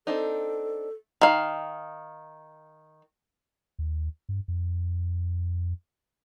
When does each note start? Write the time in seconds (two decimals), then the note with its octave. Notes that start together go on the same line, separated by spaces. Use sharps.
0.07 C4 D4 D#4 A4
1.21 D#3 F5
3.79 D#2
4.29 G2
4.48 F2